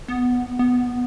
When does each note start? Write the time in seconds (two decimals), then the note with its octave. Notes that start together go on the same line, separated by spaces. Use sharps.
0.08 B3
0.59 B3